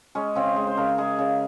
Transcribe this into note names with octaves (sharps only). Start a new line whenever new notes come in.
G#3 C#4
C#3 C4
G#3
C5
C#3 A#4
G#3 G#4
C#3